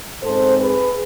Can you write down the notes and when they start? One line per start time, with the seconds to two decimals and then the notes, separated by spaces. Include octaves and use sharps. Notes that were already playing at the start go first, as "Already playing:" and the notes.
0.22 G#2 G#3 C4 A4 C5
0.59 G#4 B4